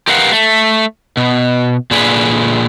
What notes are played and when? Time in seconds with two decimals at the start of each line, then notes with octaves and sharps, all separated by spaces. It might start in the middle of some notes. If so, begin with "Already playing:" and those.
0.08 G4 A#4 B4 F5 F#5
0.32 A3
1.17 B2
1.91 A#2 D3 G#4 B4